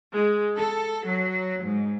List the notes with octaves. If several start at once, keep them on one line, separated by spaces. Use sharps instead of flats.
G#3
A4
F#3
G#2